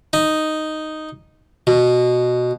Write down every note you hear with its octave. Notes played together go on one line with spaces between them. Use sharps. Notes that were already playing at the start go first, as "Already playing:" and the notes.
D#4
B2